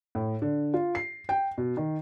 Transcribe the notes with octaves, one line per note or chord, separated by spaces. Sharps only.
A2
D3
F4
C7
G5
B2
D#3